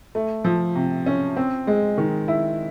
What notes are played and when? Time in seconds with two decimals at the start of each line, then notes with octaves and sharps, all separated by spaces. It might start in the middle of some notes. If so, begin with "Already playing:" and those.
0.15 A3
0.45 F3
0.75 C3
1.06 C#4
1.36 C4
1.67 G#3
1.98 D#3
2.28 E4